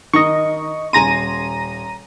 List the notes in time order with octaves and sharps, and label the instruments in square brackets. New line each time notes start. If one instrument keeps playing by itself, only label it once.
[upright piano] D#3 A#5 [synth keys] D#5 C#6
[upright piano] D#1 G#5 C6 [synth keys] A#5 A#6 D#7